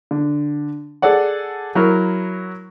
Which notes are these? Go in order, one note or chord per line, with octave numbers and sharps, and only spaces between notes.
D3
G#4 A4 D5 F#5
F#3 E4 A#4